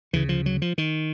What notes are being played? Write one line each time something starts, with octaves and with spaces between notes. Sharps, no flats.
D2 C#3 E3
F3
F#3
F3
D#3